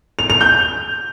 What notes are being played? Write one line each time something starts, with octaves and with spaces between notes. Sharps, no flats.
F7
F7
G6